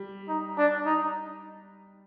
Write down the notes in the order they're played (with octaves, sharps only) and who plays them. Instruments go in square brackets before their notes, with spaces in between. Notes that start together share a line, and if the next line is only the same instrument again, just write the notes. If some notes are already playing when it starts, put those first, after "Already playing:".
Already playing: [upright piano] G3
[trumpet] D#4
D4
D#4